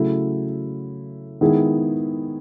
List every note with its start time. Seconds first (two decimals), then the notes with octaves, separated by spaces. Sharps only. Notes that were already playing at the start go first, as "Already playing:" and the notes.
Already playing: C#3 F#3 A3 E4
1.41 D#3 G#3 B3 E4 G#4